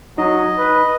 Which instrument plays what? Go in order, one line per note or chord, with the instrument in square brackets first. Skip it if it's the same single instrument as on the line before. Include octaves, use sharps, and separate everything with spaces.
[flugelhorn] F#3 [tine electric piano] D#4 [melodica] D#5
[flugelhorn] B4